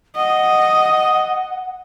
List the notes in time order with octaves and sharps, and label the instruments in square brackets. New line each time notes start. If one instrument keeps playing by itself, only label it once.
[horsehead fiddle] D#5 [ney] F#5